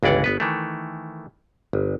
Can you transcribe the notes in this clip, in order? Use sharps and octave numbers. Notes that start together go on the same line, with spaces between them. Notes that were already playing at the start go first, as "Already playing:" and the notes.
G1 C#2 E3 D5 F#5
G1 B3 B4
D#3 E3 A3
G1